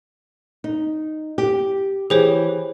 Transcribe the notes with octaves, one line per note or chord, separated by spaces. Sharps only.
D#4
G4
E3 G4 G#4 C5 C#5